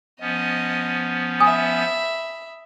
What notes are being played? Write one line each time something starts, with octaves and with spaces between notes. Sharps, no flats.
F3 B3 C#4 D#5
E5 G#5 B5 D#6